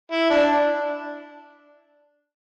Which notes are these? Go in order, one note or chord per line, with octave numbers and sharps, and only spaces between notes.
E4
D4